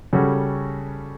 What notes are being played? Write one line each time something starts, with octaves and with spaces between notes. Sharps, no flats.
C#3 G3 C#4 F#4 A4